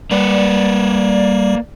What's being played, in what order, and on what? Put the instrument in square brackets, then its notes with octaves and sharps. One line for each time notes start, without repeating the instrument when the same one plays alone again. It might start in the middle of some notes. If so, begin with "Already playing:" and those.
[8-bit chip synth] G3 [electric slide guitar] A#3 B4 [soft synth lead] D5